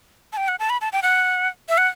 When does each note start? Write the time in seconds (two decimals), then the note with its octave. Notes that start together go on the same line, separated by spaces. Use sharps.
0.33 A5
0.37 G5
0.48 F#5
0.59 A5
0.70 B5
0.81 A5
0.93 G5
1.02 F#5
1.69 E5
1.78 F#5